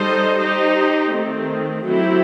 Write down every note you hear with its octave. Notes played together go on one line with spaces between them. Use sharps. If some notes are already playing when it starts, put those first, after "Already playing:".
Already playing: G3 D#4 A4 C5 D#5
D#4 G4 C5
D#3 A3 C4
F#3 A3 C4 E4 G4